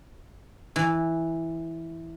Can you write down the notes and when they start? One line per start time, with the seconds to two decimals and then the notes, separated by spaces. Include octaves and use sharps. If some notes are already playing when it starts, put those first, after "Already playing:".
0.76 E3